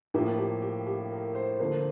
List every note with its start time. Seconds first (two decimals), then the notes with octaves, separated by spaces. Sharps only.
0.14 A2 F3 A#3 G4
0.38 G4
0.62 G4
0.87 G4
1.11 A#4
1.35 C5
1.59 D3 F3 A#3 C5